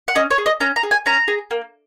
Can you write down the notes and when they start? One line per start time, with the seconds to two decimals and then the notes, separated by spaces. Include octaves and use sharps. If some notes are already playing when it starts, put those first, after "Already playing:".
0.08 F#5
0.15 C#4 D#5
0.31 C#5
0.38 G#4
0.46 D#5
0.60 C#4 A#5
0.76 A#5
0.83 G#4
0.91 G#5
1.06 C#4 A#5
1.28 G#4
1.51 A#3